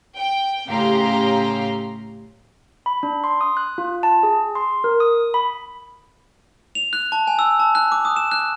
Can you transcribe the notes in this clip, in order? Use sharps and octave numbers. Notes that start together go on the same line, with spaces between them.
G5
A2 C#3 G4 F5 A#5 C6
B5
D4
C6
D#6
F#6
F4
A5
G#4
C6
A#4
D#6
B5
F7
F#6
A5
G#5
E6
A5
F#6
D6
D#6
E7
F#6